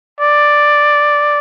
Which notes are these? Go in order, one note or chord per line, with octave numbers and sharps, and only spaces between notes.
D5